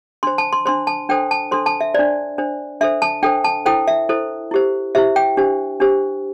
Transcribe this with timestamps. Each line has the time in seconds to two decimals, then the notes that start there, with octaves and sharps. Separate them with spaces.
0.23 D4 C5 C6
0.38 A5
0.53 C6
0.66 D4 C5 C6
0.87 A5
1.09 D4 A4 C5 G5
1.31 A5
1.51 D4 A4 C5 C6
1.66 A5
1.81 E5
1.94 D4 C5 D5
2.38 D4 C5
2.81 D4 A4 C5 E5
3.02 A5
3.23 D4 A4 C5 G5
3.44 A5
3.66 E4 A4 C5 G5
3.88 E5
4.09 E4 A4 C5
4.51 E4 G4 C5
4.95 E4 G4 C5 E5
5.16 G5
5.37 D4 G4 C5
5.80 D4 G4 C5